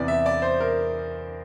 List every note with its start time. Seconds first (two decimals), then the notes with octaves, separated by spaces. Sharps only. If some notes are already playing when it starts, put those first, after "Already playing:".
Already playing: E2 C3 E3 D5
0.08 E5
0.26 D5
0.42 C5
0.60 A#4